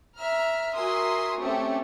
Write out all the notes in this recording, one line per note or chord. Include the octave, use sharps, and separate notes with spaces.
E5 A#5 F6
F#4 A#4 E5 G#5 C6 D#6
A3 C4 C#4 G4 A4